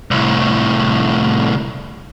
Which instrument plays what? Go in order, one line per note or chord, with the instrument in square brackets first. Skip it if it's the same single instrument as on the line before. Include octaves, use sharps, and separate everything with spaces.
[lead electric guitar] C2 A2